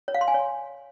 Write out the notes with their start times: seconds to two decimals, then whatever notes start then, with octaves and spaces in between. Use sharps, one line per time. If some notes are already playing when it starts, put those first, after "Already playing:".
0.08 C#5
0.15 F5
0.21 C6
0.28 G#5
0.34 C#5